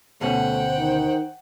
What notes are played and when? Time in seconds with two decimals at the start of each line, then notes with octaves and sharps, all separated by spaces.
0.21 D2 B2 A3 C#4 C5 F#5 G5
0.78 D#3